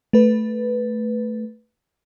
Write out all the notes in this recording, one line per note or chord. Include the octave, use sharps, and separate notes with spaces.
A3 B4